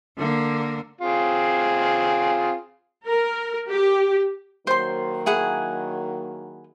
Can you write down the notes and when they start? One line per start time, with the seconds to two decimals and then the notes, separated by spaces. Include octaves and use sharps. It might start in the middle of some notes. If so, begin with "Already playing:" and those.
0.17 D3 A#3
1.01 C4 F4 G#4
3.06 A#4
3.69 G4
4.67 D#3 F#3 A#3 C5 C6
5.26 E4 G#4 F#5